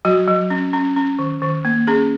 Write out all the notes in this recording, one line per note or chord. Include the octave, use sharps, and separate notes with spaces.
F#3 F#4
F#3
C#4
C#4
C#4
D#3
D#3
A#3
C#4 G#4